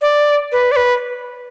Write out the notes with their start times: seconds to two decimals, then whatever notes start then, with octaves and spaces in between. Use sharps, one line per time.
0.01 D5
0.52 B4
0.72 D5
0.76 B4